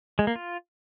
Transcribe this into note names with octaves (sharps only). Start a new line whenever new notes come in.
G#3
A#3
F4